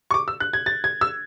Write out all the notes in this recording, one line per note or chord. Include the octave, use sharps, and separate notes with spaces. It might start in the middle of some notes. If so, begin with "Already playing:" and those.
C#6
D6
E6
F#6
G#6
A6
G#6
E6